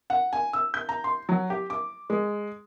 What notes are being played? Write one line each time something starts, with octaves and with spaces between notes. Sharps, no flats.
F#5
G#5
E6
G6
A#5
C6
F#3
G4
D6
G#3